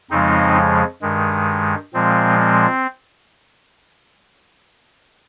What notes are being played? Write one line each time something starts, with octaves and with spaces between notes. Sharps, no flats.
F2 C#3 F3 G#3 C4 D#4
G2 D#3 G#3
A#2 F3 G#3 C4
C4